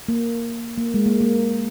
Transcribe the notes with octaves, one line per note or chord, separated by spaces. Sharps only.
A#3
A#3
G#3
A#3
A#3